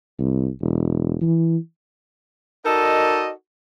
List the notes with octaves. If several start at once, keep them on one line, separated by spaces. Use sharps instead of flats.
C2
E1
E3
D#4 F#4 A4 A#4 D5 D#5